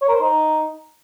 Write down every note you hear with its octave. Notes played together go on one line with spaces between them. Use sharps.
C#5
A#4
C5
D#4